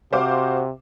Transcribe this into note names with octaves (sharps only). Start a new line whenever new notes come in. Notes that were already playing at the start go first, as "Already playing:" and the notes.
C3 F#4 C5 F5 D6